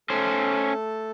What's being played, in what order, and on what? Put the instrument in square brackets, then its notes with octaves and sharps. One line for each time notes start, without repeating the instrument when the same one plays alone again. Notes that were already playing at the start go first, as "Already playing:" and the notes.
[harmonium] A3 A4 A5 [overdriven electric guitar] C#4 C5